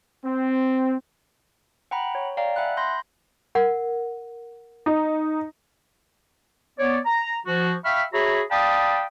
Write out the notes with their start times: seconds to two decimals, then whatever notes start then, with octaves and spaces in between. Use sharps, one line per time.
0.25 C4
1.91 F#5 G5 A#5 B5
2.15 C#5
2.37 D5 F5 G5 A#5
2.56 E5 F#5 G#5 B5 F#6
2.77 B5 C6 G6 A#6
3.55 A#4 F#5
4.86 D#4
6.79 B3 C#5 D5
7.06 A#5
7.47 F3 F#4
7.85 E5 F5 G5 B5 C#6 F6
8.13 F#4 G#4 C#5 E5 A#5 B5
8.51 D5 F5 G5 A5 B5 D#6